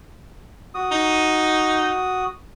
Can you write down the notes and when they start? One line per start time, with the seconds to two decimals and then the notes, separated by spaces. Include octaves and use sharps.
0.74 F#4 D#6
0.91 D#4